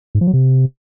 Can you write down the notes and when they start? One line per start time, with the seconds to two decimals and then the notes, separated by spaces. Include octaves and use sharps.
0.15 G#2
0.21 F3
0.27 F#3
0.33 C3